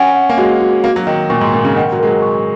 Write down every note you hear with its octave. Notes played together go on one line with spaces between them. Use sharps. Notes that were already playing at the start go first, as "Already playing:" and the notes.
Already playing: C#4 F#5 G#5
F#5
A#3
G#3 F#4
F#4
A#3 F#4
F#3
D#3 D#5
A#2 C#6
G#2
A#2 A#4
C#3
D#3 F#5
F#3
G#3 A#4
F#3
C#6